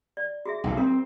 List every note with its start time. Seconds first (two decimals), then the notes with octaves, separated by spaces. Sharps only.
0.17 D5
0.45 F#4 G#4 E5
0.64 B1 A2
0.77 C4 F4 A#4